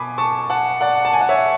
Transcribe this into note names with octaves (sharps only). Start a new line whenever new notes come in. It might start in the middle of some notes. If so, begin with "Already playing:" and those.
Already playing: B2 G#5 B5 D6
A5 C#6
F#5 A5
D5 F#5
A5
G#5
F#5
C#5 E5